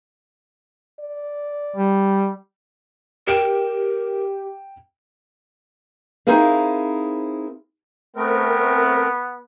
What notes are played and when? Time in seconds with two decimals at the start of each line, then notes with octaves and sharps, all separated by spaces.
1.00 D5
1.76 G3
3.27 G4 A#4 G5 E7
6.27 C4 D#4 E4 G#4 A#4 F5
8.16 A3 B3 C4 A#4